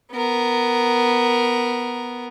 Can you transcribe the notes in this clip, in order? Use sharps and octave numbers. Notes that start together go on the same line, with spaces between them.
B3 A#4